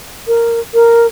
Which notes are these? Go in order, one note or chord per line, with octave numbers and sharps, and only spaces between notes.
A#4
A#4